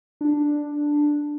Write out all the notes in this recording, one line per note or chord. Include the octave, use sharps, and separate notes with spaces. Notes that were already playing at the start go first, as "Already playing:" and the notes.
D4